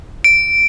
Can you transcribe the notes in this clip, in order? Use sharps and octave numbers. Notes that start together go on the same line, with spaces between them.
D7